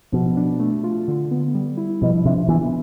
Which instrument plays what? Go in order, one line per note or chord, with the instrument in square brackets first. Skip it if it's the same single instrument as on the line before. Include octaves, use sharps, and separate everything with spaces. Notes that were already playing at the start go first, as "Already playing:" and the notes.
[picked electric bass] B2 [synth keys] F3
[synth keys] D4
A3
F4
D3
B3
G3
E4
[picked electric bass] B2 [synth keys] F3
[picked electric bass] C3 [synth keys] D4
[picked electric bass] E3 [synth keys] B3